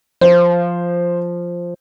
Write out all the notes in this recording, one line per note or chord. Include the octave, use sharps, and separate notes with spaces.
F3 C5